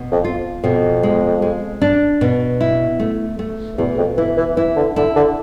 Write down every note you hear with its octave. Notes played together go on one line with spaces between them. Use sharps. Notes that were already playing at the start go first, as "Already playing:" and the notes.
Already playing: B2
F2
F4
F2 B2
G#3
G#3
D4
B2
E4
A3
A3
E2 B2
F2
E3 E4
E3
E3 E4
D3
D3 E4
D3